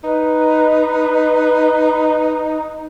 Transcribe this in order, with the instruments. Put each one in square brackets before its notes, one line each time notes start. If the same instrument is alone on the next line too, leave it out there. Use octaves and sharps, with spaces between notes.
[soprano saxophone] D#4 [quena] B4